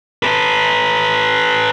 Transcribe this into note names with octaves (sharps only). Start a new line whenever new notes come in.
A4 B4